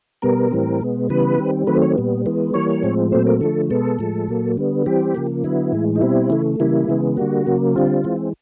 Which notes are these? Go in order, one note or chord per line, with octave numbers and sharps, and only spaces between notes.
B2 G3 B3 A#4
A2 E3 G3 C4
B2 G#3 B3
C#3 E3 G3 B3 B4
D#3 G3 C4
D#3 F#3 A3 C4 B4
C#5
A#2 G3 B3
E3 G#3 B3
E3 G3 A#3 C#5
A2 F3 G#3 C4
A#2 F#3 A3 C4 C5
A#4
D3 F3 A3 A4
B2 G#3 B3 A4
A2 F3 G#3
A#2 F#3 A#3
D3 G3 B3
E3 G3 C4 G4
C#3 F3 A#3
D3 F#3 B3 E4
A2 E3 G#3
D#4
B2 G3 C4 E4
C#3 E3 A3
C#3 E3 G3 A#3 E4
C#3 E3 G#3 B3
D3 G3 A#3 F#4
C#3 F#3 A#3
D3 G3 C4 F4
E3 G#3 C4